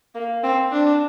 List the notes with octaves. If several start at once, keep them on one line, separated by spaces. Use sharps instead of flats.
A#3
C4
D4